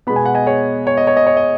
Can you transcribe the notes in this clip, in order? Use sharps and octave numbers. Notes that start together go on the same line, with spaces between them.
B2 G#3 B3 B5
G#5
F#5
D#5 G#5
G#4 C#5
C#5
D#5
C#5
D#5
C#5
D#5